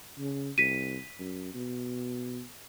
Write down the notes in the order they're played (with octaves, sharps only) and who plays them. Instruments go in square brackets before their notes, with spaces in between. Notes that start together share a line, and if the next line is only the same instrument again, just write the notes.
[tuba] C#3
[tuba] C2 [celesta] B6 D#7
[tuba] F#2
B2